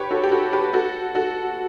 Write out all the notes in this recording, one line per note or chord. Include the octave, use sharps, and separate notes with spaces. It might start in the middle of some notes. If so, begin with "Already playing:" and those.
Already playing: G4 B4 C#5
F#4 A4
G4
F#4 A4
G4 B4
F#4 A4
F#4 A4